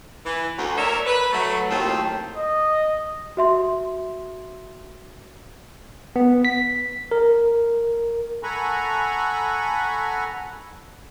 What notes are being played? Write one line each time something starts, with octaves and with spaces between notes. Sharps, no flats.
E3
D2
A#4 C#5 D5 E5
B4
F#3 A3
D#2 A2 F#3 C4 F4
D#5
F#4 E5 C6
B3
B6
A#4
A4 F#5 G#5 A#5 B5 C#6